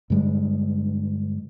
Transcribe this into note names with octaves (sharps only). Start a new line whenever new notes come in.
G2 D3 G3 G#3